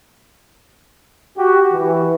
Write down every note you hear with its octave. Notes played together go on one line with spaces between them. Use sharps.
F#4 G4
E3